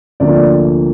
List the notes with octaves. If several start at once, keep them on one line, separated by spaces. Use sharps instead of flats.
D2 C3 F3 A#3 D5